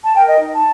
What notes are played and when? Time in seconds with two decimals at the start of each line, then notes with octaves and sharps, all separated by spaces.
0.04 A5
0.15 A#4 G5
0.27 D#5
0.40 D#4
0.53 A5